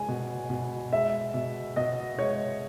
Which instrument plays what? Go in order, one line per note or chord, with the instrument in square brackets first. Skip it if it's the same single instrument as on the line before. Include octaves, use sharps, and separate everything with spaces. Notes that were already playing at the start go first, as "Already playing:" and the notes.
Already playing: [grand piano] G#3 [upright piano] G#5
[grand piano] B2
B2
[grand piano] G#3 [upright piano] E5
[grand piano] B2
[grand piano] B2 [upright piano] D#5
[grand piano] G#3 [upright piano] C#5